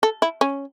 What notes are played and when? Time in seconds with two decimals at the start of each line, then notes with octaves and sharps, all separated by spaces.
0.03 A4
0.22 E4
0.41 C#4